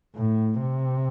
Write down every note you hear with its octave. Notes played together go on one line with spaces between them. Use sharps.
A2
C3